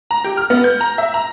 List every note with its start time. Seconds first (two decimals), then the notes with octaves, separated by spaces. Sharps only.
0.11 A#5
0.24 G4
0.37 F6
0.50 B3
0.64 G6
0.81 A#5
0.98 E5
1.14 A#5